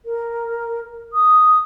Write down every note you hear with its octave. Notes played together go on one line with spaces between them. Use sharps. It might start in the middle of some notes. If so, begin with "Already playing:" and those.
A#4
D#6